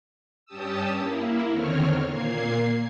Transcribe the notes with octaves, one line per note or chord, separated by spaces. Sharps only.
G2 C#4 G4 A5 D#6 E6
A#3 E4
E2 D3 D#3 C4 C#5 F6
A#2 A#3 G#6 C7